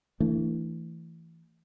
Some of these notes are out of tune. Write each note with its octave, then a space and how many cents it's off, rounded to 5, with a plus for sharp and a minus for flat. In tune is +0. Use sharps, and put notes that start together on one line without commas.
E3 +0 A3 +30 D4 -5